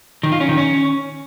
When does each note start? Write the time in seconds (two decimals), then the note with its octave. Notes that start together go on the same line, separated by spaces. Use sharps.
0.23 D#3
0.32 F4
0.40 C#4
0.49 D#3
0.57 C#4